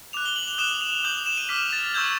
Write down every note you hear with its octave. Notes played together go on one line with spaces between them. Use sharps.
D6 F#6 F7
G7
F#7
F7
D#6 F#6 E7
F7
D#6 G6 F#7
F7
E7
D#7
D6 F6 B6
A6
A6
C#6 E6 G6 G#6